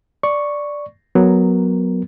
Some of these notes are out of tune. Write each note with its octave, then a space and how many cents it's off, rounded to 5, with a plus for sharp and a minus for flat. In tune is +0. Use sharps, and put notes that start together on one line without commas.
D5 +0 C#6 +0
F#3 +0 B3 +0 A#4 +0